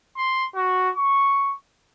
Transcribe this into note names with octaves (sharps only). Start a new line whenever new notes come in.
C6
F#4
C#6